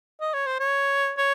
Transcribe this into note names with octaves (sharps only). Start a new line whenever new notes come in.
D#5
C#5
C5
C#5
C#5